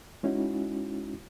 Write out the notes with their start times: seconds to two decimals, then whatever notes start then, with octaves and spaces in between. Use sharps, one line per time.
0.23 G#3 C#4 D#4 E4 F#4